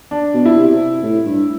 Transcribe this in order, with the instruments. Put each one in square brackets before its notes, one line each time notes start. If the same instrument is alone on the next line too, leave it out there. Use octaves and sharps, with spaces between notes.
[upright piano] D4
[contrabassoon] B2
[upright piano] E4
[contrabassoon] B2
C3
A2
G2